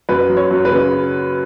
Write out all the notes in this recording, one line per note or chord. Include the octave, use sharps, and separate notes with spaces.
F#2 B4
F#3
C#5
F#2
B4
C#3